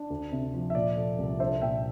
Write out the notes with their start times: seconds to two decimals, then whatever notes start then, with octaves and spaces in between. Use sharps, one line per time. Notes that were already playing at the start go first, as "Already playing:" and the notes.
Already playing: D4
0.10 D2
0.32 C3
0.54 F3
0.70 E5
0.75 A#2 D5
0.96 A3
1.18 C2
1.40 D4 C5 E5
1.62 A#2 E5 G5